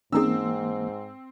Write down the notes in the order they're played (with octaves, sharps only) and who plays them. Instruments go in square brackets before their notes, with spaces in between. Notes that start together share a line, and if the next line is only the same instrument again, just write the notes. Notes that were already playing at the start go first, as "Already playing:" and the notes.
[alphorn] G#2 [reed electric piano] E3 A#3 [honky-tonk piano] C4 E6 [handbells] C#4 D#4 G#4